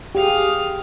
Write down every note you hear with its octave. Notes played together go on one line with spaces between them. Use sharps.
G4 G#4 F5 D#6